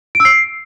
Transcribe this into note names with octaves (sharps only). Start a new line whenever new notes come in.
D7
E6
C7